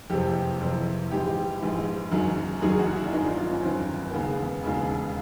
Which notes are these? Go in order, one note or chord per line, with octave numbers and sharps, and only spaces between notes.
F#1 F2 C3 E3 G4
F#1 F2 C3 E3
A#1 G#2 E3 G4
A#1 G#2 E3
F#1 F#2 D#3 F#3
F#1 F#2 D#3 F#3 G#4
F#4
E4
D4
G1 F#2 D#3 D#4
F4
F4
C#4
G1 F#2 D#3 C4
A#3
E1 D#2 C#3 B3
E1 D#2 C#3